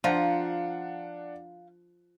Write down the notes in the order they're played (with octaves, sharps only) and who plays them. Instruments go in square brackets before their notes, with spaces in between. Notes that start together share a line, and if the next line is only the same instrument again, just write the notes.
[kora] F3 [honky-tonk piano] D4 F#5 [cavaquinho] F4 A#5